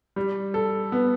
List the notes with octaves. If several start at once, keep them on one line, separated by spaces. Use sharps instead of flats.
G3
A4
B3